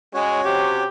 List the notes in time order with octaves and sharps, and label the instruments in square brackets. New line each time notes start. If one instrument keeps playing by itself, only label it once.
[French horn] G#3 [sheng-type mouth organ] C#4 F#4 C#5
[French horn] C3 [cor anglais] G4